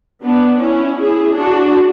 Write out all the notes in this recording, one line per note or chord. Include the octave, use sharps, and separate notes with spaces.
B3 D4
C#4 E4
E4 G#4
D4 F#4